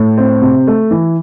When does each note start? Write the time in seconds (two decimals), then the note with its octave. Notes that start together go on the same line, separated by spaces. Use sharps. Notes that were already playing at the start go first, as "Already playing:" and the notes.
Already playing: A2
0.17 C4
0.42 C3
0.67 A3
0.91 E3